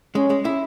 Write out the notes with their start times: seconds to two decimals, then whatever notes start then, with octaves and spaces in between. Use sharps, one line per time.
0.15 G#3 C#4
0.30 G#3
0.45 E4